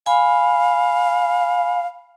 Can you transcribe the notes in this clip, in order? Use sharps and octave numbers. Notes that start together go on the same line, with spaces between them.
F5 G#5 B5